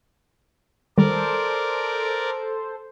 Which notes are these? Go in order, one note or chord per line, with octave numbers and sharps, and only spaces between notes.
D#3 G3 A4 A#4 C5 D5